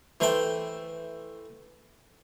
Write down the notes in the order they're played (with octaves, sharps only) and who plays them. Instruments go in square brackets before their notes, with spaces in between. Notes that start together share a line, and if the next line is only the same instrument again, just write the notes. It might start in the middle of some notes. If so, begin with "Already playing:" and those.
[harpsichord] E3 A3 C5 E5 G5 A5